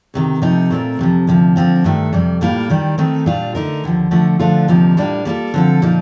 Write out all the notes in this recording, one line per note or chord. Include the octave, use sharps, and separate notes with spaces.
D2 C3 D#3
C3 F3 A3 D#4
A#2 A3 C4 F4 A#4
F2 C3 F3
D2 C3 F3
D3 F3 C4 F4
G2 D#3 A3 D4
F2 C3 G3
A2 G3 A#3 F4
D#2 D#3 G3
D#3 A3 C4 D#4
A#2 G3 D4 F4
D3 A3 D#4 A#4
D#2 D3 F3
D3 F3 A3
D3 F3 A3 D4 F4
D2 C3 F3 A#3 D#4
A2 G3 A#3 D4 F4
G3 A#3 D4 F4 A4
D3 F3 C4 F4 A4
A#2 F3 A#3 D#4